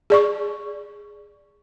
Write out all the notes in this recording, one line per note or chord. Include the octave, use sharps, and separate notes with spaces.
G#4 D5 C#6